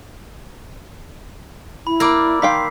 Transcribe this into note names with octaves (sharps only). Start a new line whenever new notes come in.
E4 B5
A#3 D5 B5 D6 E6
D#3 F5 G5 C6 B6 C7